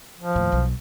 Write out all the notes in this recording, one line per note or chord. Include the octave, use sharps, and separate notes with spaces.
F3
D#2 A2
B1